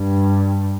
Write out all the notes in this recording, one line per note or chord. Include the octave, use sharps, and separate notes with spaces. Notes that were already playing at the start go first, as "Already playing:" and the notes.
Already playing: G2